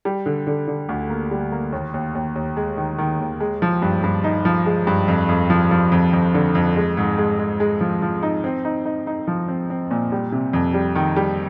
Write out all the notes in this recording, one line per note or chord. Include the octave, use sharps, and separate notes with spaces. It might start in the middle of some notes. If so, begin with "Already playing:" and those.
G3
D3
D3
D3
D2
A#3
G3
A#3
D#2
D#2
D#2
D#2
G#3
D#3
D#3
D#2
G#3
F3
G2
G2
D#4
F3
G#3
G2
F2
F2
F3
F3
F2
F2
D3
F2
G#3
G#2
G#3
G#3
G#3
F3
F3
D#4
C4
D#4
D#4
D#4
F3
C4
C4
A#2
G3
C3
F2
G3
D#3
G3